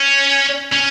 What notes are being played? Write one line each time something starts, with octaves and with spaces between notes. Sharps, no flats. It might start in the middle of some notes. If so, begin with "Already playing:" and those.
Already playing: C#4
C#4